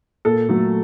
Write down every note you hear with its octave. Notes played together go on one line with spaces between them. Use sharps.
A#2 A4
F#3 A3